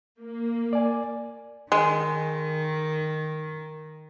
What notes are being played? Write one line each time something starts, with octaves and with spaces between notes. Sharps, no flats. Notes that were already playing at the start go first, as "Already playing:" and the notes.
A#3
D5 G#5
D#3 G#3